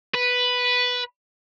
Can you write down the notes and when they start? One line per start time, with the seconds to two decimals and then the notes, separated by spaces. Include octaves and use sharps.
0.15 B4